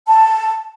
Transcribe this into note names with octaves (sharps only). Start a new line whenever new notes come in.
A5